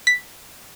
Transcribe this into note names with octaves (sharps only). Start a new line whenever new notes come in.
B6